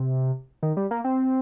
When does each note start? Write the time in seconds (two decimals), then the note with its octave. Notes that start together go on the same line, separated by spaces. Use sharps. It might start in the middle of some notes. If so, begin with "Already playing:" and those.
Already playing: C3
0.63 D#3
0.77 G3
0.91 A#3
1.04 C4